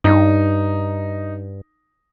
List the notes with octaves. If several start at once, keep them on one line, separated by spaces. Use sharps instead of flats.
G2 D#4